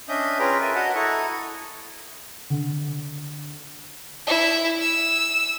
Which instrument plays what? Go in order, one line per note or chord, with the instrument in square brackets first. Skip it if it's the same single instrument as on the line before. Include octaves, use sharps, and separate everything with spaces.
[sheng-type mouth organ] C#4 D4 D#5 E5 D#6 G6
C#4 F4 G#4 B4 G5 A#5
A#4 D5 E5 G#5
F#4 D#5 F#5 A5 A#5 D#6
E4 A4 A#5 C#6 D#6
[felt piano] D3
[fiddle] E4
E6